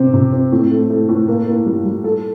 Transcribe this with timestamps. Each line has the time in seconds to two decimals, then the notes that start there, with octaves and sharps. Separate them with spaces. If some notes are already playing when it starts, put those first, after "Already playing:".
Already playing: C3 C4
0.14 C3
0.33 C4
0.52 A2
0.71 A3
0.90 A3
1.09 A2
1.28 A#3
1.47 A#3
1.66 G3
1.85 G3
2.04 A4